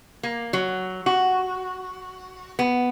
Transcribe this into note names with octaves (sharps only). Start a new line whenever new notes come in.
A#3
F#3
F#4
B3